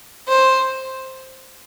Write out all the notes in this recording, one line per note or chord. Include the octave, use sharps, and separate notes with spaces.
C5